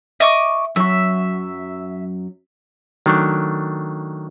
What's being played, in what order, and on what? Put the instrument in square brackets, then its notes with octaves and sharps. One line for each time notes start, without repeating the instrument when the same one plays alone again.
[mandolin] D#5 C#6 D6 [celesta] E5
[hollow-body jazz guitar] F#2 F#3 [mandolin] E5 [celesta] C#6 E6
[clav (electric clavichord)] D#3 F#3 A3 D4